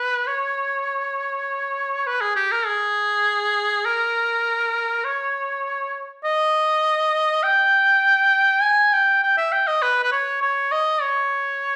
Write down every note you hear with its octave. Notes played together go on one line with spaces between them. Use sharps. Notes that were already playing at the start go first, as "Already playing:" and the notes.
Already playing: B4
C#5
B4
G#4
G4
A#4
G#4
A#4
C#5
D#5
G5
G#5
G5
G5
E5
G5
D#5
B4
B4
C#5
C#5
D#5
C#5